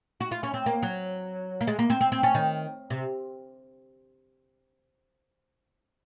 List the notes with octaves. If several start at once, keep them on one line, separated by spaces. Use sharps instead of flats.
F#4
F4
C#4
C4
A#3
F#3
A#3
G#3
A#3
C4
C4
C4
C#4
D#3
C3